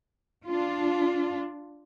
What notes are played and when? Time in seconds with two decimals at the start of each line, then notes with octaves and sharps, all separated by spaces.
0.47 D4 F4